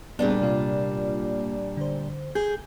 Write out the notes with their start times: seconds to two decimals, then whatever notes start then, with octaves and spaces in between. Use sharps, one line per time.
0.19 A#2 G3 B3 C4 D4 G#4
0.42 C3 A#3 F4
1.77 D3 C5
2.35 G#4 G6